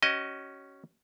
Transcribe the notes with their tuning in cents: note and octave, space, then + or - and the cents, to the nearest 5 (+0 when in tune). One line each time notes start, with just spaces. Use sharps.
C#4 +0 F#4 +40 D#5 +0